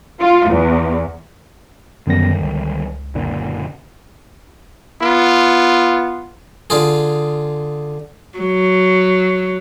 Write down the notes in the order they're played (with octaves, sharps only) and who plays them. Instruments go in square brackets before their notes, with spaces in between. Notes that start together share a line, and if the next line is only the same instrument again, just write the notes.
[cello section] F4
E2
[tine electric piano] F#2 B3 A#6 [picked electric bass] D3 D#3 G3
[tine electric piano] C#2
[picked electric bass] F#1 A#2 D3
[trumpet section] B3 F4
[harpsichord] D3 F4 G#4
[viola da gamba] F#3